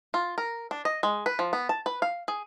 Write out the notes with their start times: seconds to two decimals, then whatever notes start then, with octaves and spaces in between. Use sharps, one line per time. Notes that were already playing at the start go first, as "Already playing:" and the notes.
0.14 F4
0.38 A#4
0.71 D4
0.85 D#5
1.03 G#3
1.26 B4
1.39 F3
1.53 B3
1.69 A5
1.86 B4
2.02 F5
2.28 G#4